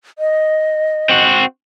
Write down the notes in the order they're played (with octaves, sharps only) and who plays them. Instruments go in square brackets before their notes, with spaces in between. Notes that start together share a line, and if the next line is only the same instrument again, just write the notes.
[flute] D#5
[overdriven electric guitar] C4 F#4